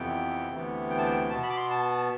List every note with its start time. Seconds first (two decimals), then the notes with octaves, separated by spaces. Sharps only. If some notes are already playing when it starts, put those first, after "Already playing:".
Already playing: F2 C3 E3 B3 G5
0.51 D2 C3 E3 B3
0.90 G5
0.98 A5
1.06 G5
1.30 B2 B3 A5
1.43 B5
1.50 D6
1.57 C6
1.70 A5